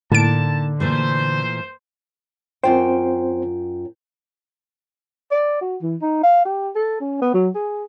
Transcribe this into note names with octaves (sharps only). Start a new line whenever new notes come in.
A2 D3 A#3 D#4 A5 D7
A#2 E3 A3 C5
F#2 C4 F4 C5 G5
D5
F#4
E3
D#4
F5
G4
A4
C#4
B3
F#3
G#4